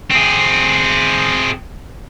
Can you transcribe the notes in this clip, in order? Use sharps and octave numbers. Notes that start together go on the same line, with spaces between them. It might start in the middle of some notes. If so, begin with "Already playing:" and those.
C4 G#4